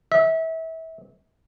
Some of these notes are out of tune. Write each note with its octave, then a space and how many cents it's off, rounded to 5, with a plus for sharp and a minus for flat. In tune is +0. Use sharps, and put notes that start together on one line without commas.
E5 -30